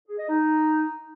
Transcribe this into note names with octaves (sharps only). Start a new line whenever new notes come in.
G#4
D#5
D#4